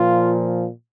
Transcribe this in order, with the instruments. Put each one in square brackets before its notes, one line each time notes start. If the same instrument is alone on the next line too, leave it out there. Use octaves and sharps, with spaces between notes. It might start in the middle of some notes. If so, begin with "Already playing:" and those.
Already playing: [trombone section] A#2 F3 F4